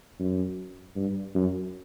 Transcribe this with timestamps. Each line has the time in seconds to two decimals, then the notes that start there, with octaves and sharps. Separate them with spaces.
0.20 F#2
0.96 G2
1.35 F#2